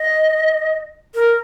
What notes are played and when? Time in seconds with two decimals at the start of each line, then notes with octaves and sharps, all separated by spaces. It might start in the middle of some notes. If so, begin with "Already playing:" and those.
Already playing: D#5
1.15 A#4